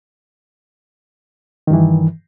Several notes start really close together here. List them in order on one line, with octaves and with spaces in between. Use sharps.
D#3 G2 E3